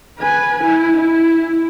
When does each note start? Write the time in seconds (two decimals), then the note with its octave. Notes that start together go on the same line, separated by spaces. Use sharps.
0.19 B4 G#5
0.63 E4
0.97 E4